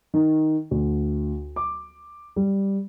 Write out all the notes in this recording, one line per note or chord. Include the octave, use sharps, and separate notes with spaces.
D#3
D2
D6
G3